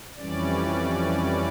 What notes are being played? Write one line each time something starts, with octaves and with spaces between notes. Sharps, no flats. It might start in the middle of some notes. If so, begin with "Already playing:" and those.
F2 E3 G3 C#4 D5